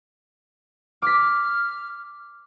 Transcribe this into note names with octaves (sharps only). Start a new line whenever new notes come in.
D6 F6 B6